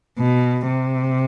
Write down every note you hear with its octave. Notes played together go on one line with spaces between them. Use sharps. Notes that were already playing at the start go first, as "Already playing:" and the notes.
B2
C3